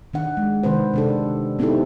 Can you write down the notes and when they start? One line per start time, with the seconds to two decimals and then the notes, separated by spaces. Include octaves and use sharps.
0.14 D#3 D4 F#5
0.37 G#3
0.63 C3 D#3 C4 B4 C5
0.94 C3 D4 A4
1.59 B3 C4 D#4 E4 G4 A4